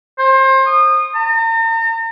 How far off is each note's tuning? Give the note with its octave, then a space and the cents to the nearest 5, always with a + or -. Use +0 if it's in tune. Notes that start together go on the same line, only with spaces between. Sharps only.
C5 +30
D#6 -25
A#5 -45